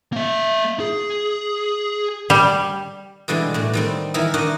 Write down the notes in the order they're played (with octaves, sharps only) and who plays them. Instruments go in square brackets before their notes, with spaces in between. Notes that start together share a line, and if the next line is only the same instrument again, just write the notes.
[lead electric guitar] A#3 E5
G#4
[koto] G3
[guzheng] B2 D3 E3 G3 G#3
A2 D4 F#4
D#3 G3 C4
D#3 E3 B3 E4 A#4
D#3 D4 D#4 F#4 D#5